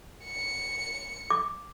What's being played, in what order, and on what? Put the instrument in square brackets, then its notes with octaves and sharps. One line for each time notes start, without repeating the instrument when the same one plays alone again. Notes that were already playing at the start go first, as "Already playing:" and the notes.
[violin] C#7
[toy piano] D6